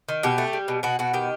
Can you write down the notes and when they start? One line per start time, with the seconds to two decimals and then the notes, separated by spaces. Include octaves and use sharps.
0.09 D#3
0.23 B2 G4
0.38 A3
0.53 G3
0.68 B2
0.83 B2 F#4
0.99 B2 F#4
1.13 D#3 G4